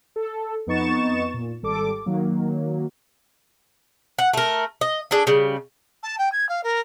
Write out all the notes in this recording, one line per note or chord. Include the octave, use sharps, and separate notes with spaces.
A4
F2 B3 D#4 C#6 A6 E7
A#2
G#1 G3 A4 D6
D#3 F#3 A#3
F#5
A3 A#4
D#5
D4 G#4 A4
C#3 G3
A5
G5
G#6
F5
A#4